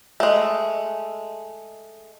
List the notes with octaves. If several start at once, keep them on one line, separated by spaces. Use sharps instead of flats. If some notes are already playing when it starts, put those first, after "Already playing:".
G#3 A3